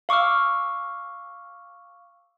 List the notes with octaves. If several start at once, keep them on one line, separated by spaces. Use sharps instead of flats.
F5 C#6 D6 E6 F6